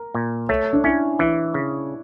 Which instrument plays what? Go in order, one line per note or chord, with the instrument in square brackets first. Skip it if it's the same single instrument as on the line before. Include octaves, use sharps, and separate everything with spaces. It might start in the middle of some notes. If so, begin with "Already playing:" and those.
Already playing: [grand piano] A#4
[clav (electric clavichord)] A#2
[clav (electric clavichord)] A3 [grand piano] C#5
[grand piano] D4
[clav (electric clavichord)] C#4 [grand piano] E4
[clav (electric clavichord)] E3 [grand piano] E4
[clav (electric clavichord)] C#3